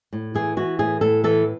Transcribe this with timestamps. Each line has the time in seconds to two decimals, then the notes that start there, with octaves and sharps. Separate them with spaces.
0.13 A2
0.35 E3 G#4
0.57 E3 F#4
0.79 A2 G#4
1.01 A2 A4
1.24 E3 A4